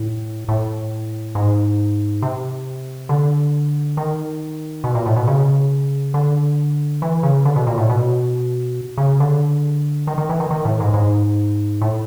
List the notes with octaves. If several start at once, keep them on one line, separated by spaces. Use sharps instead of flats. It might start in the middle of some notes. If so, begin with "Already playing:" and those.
Already playing: A2
A2
G#2
C3
D3
D#3
B2
A#2
A2
B2
C#3
D3
E3
C#3
D3
B2
A#2
A2
B2
C#3
D3
D#3
D#3
E3
D#3
D#3
A2
G#2
G#2
A2